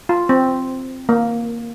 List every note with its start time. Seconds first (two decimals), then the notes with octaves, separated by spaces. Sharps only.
0.09 F4
0.29 C4
1.09 A#3